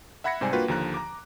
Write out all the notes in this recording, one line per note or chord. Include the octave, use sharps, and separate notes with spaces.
E5 F#5 B5 G#6 A#6 C#7
G#2 C3 G3 C5 D5 G#5
A#3 D4 F4 F#4 B4 G5
D#2 D3 F3 A#5 F#6
A#5 D6